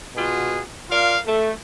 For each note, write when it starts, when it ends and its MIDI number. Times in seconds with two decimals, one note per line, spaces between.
0.16 0.61 47
0.16 0.61 65
0.16 0.61 66
0.16 0.61 68
0.89 1.17 65
0.89 1.17 70
0.89 1.17 74
0.89 1.17 77
1.26 1.51 57